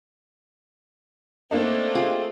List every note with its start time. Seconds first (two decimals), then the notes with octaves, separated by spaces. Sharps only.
1.51 A3 A#3 C4 D4 D#4
1.95 F4 G4 G#4